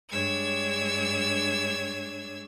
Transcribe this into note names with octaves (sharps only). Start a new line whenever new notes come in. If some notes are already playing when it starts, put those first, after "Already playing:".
G2 G#3 D4 C#5 E6 G#6